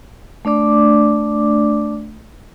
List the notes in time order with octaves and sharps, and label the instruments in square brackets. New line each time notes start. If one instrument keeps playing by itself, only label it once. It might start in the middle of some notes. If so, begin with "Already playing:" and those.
[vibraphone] A3 D4 D5 D6